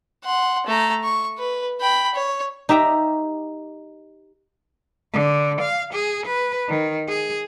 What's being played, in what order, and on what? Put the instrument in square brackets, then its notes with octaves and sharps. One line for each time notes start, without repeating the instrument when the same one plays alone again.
[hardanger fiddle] F#5 C6
A3 A#5
C#6
B4
G5 B5
C#5
[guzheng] D#4 G4 E5 G5 A#5
[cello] D3
F5
G#4
B4
D#3
G#4